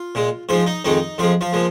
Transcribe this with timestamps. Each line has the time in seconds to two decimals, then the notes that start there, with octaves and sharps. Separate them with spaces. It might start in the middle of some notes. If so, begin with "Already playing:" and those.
Already playing: F4
0.15 A#2 G#3
0.49 G#2 F3 G#3 F4
0.66 D#4
0.84 F2 D#3 G#3 D#4
1.18 F2 F3 G#3 F4
1.41 F3 F4
1.52 A#2 F3 G#3